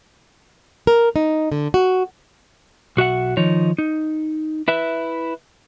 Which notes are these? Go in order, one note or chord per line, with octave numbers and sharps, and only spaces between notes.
A#4
D#4
D3
F#4
B1 F#4 E5 F#5
D#3 F3 D#4 C#5
D#4
E4 B4 E5